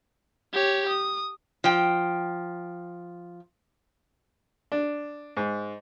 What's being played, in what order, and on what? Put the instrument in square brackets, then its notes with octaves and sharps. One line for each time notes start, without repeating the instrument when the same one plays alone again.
[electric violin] G4 C#5
D#6
[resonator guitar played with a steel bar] F3 G5
[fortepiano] D4
G#2